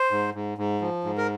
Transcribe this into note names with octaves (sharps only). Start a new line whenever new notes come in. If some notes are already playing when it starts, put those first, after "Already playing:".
Already playing: C5
G#2
G#2
G#2
F3
G#2
A#4